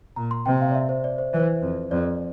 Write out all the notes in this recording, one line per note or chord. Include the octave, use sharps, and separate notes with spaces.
A#2 A#5
C6
C3 G5
F5
D5
E5
C5
D5
C5
E3
C5
F2
F2 D5